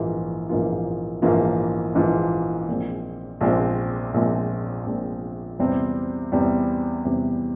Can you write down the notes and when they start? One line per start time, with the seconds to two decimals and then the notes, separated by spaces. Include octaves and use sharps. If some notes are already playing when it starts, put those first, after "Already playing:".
Already playing: A#1 G#2 E3 A#3 F4
0.49 A#1 G#2 E3 A#3 F4
1.22 A#1 G#2 E3 A#3 F4
1.94 A#1 G#2 E3 A#3 F4
2.68 A#1 A#2 G#3 C4
3.41 A#1 A#2 G#3 C4
4.14 A#1 A#2 G#3 C4
4.86 A#1 A#2 G#3 C4
5.59 E2 C3 G3 C4
6.32 E2 C3 G3 C4
7.05 E2 C3 G3 C4